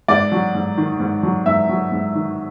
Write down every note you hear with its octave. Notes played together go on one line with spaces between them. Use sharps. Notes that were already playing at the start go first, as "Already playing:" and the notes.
G#2 D5
F#3
G#2
D#3
G#2
F#3
G#2 E5
F#3
G#2
D#3